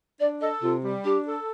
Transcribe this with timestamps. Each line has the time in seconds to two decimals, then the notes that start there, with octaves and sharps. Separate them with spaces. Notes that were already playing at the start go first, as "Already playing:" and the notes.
0.20 D4 D5
0.41 A4 D#5
0.62 C3 F4
0.83 G3
1.04 D4 G4
1.25 A4